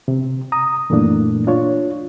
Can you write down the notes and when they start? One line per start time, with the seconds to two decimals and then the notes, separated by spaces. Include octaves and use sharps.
0.08 C3
0.52 A#5 D#6
0.90 F#2 A#2 E3 A3 A#3 D4
1.47 D4 F4 C#5